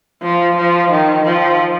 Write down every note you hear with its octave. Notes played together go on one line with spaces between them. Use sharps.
F3
F3
D#3
F3